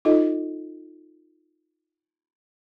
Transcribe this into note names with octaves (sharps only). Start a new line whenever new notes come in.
D#4 F4 A4 D#5